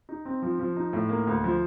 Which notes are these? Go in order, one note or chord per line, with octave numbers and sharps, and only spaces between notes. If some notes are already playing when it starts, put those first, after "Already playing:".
D#4
C4
F3
F3
D#4
A2
A#3
D2
F3